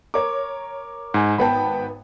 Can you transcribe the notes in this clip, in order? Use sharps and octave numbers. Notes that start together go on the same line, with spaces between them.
A#4 C#5 D6
G#2 G#5
G#1 B3 G5 A5 B5